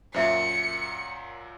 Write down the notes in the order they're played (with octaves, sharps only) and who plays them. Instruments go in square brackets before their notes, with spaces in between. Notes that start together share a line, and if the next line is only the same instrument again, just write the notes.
[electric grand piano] F#2 A#2 F#3 [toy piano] C5 E5 [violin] C#7